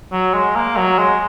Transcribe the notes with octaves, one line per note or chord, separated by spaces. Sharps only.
F#3
G#3
A#3
F#3
G#3